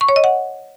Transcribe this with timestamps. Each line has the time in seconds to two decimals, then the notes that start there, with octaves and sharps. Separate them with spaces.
0.01 C#6
0.09 C#5
0.16 D#5
0.24 F#5